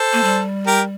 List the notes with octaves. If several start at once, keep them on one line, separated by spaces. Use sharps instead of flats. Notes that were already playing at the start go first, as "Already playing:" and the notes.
Already playing: A4 C5
A#3
G3
G4 A#4